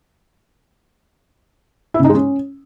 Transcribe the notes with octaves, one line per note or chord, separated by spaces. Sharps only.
E4
C#3
D#4
G#3
C#4